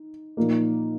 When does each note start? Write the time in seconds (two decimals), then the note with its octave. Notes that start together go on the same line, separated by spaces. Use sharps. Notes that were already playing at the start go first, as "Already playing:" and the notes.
Already playing: D#4
0.37 A#2 F3 A#3 D#4